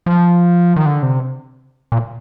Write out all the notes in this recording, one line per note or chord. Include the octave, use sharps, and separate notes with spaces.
F3
D#3
D3
C3
A#2